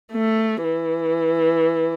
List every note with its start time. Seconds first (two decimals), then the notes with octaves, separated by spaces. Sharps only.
0.12 A3
0.63 E3